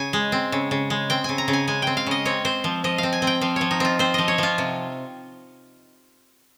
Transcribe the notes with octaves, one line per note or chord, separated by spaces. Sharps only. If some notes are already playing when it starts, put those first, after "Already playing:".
Already playing: C#3 G#5
G#3
C4
C#3
C#3
G#3
C4 G5
C#3 G#5
A#5
C#3
G#5
G#3 G#5
C4 G5
F5
C#3 D#5
C4 C#5
C4 C5
F3
F3 D#5
C4 F5
G#5
C4
G5
F3 F5
F3 C#5
D#4
C4 F4
C4 C5
F3 D#5
C#5
F3 F4
C3